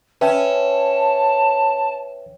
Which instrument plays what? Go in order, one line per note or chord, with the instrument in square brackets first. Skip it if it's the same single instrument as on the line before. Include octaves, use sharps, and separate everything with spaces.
[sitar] C#4 [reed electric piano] B4 E5 G5 [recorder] A5